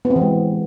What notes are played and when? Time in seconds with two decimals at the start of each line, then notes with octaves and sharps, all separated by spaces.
0.05 B3
0.10 C4
0.16 E3
0.21 G#3